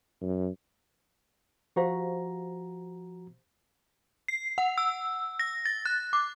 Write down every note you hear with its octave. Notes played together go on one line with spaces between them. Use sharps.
F#2
F3 F#4 G4 C5 F5 A#5
C7
F#5
E6
A#6
A6
F#6
D6